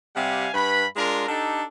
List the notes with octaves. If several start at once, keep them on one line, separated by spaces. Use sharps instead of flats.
C3 G3 F5 F#5 G#5
G2 B4 B5
G#3 D4 F4 A#4
D4 D#4 G4 A4